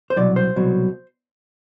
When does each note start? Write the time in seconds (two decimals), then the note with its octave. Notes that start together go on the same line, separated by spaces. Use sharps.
0.10 C5
0.16 C2 B2 F#3 D5
0.36 C5
0.56 C2 B2 F#3